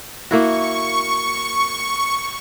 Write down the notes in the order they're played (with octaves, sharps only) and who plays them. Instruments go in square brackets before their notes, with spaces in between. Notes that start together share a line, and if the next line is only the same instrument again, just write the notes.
[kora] A#3 E4 F#4 [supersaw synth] C#6